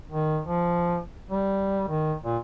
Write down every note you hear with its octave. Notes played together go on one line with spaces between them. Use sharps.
D#3
F3
G3
D#3
A#2